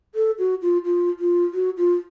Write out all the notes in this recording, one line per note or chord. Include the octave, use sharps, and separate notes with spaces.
A4
F#4
F4
F4
F4
F#4
F4